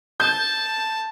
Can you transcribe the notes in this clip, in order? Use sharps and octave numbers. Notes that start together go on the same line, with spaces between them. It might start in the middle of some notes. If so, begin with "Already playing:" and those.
A5 G6